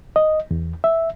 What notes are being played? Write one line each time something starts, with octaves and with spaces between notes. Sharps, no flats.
D#5
E2
E5